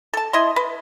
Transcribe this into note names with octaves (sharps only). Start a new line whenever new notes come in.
A4 A5
E4 D#5 C6
B4